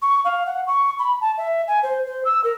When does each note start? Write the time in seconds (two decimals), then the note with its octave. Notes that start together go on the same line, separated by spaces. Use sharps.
0.02 C#6
0.25 F5
0.46 F#5
0.67 C#6
0.99 B5
1.21 A5
1.37 E5
1.68 G#5
1.83 C5
2.06 C5
2.25 E6
2.44 A#4